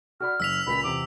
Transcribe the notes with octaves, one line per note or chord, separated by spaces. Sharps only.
F#4 D5 B5 F6
F#1 E6 B6 F7
C#2 A#2 B5
E2 C3 D6